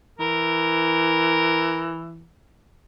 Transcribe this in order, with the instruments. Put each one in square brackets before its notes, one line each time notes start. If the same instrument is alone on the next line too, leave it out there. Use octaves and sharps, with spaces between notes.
[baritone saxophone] E3 [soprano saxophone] A#4